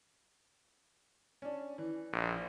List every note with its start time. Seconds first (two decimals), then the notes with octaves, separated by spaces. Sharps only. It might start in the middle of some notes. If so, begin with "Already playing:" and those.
1.42 C#4 D4
1.78 E3
2.12 A#1